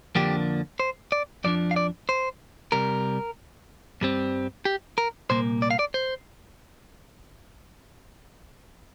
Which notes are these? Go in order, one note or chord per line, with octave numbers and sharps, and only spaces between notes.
F2 D3 F3 A#3 D4 G4
C5
D5
F2 F3 D4 D5
F5
D5
C5
C2 C3 G3 A#4
G2 G3 C4
G4
A#4
C2 A#2 A#3 C5
D5
F5
D5
C5